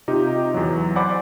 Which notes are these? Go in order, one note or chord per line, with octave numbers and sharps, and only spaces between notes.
C3 D#4 F4 G4
E2 F#3
C5 D5 F#5 G#5 B5 D6